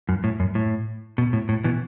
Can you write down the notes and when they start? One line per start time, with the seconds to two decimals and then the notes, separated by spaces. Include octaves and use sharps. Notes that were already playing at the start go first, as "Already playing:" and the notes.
0.09 F#2
0.24 A2
0.40 F#2
0.55 A2
1.18 B2
1.33 A2
1.49 A2
1.64 B2 E3